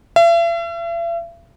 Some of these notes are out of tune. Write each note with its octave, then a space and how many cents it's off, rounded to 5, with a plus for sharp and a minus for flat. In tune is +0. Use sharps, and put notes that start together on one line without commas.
E5 +45